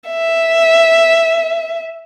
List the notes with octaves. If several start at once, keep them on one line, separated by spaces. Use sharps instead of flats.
E5